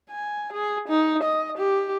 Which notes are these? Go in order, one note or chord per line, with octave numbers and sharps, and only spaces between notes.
G#5
G#4
D#4
D#5
G4